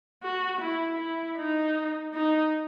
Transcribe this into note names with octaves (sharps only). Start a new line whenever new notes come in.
F#4
E4
E4
D#4
D#4